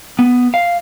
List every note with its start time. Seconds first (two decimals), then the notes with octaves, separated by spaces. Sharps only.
0.19 B3
0.54 F5